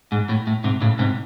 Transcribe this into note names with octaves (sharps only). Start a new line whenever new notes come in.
G#2
A2
A2
G#2 C3
A2 C#3
G#2 C3